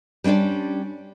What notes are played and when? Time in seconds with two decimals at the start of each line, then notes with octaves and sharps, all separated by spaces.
0.24 G3 C#4 D4 C5 D5